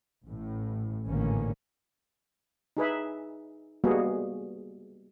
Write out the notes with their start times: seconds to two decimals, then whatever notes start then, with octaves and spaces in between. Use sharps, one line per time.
0.24 A1 A2
1.06 A1 G#2 D3 D#3 A#3 C#4
2.77 D#4 G#4 B4 E5
3.84 G3 G#3 A#3 B3 F#4 G#4